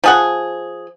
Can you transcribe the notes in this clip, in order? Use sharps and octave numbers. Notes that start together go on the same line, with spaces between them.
F3 G#4 F#5